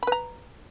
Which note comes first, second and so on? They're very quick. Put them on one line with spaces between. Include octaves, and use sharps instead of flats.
B5 B4 A#5